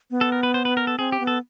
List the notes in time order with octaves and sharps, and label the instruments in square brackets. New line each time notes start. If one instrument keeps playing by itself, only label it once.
[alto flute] B3
[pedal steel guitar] A4
A#4
B4
C5
B4
A#4
A4
[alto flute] C4 [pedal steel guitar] G#4
[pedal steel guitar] G4
[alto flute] B3
[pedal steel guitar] A4